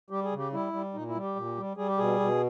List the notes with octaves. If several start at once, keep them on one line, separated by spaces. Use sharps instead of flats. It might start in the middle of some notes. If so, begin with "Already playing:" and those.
G3 G4
G#4
C#3
G4
G3 E4
G3
A#2 D#4
E4
G3
G4
A#2
G3
G3 G#4
G4
B2 G#4
B2